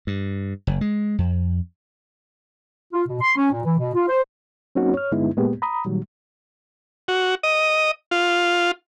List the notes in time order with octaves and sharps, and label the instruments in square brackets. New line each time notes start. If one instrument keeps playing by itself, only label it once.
[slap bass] G2
F#1
G#3
F2
[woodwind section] F4
B2
C6
C#4
A#2
E3
B2
F4
C5
[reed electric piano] F#3 A#3 C4 C#4 D#4 F#4
C#5 F6
G2 D3 G#3 B3 D#4 E4
A#2 G#3 A#3 B3 G4
A#5 B5 D#6
A#2 D#3 F#3 G3
[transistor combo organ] F#4
D#5
F4